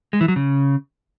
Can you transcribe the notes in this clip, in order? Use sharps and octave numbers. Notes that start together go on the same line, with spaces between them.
G#3
E3
F#3
C#3